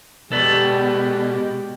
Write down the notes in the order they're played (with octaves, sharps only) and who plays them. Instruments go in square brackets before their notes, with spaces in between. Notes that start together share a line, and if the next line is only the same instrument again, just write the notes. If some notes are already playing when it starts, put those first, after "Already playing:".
[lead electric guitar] B2 [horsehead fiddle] G#3 G4 [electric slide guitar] A4 B4 D5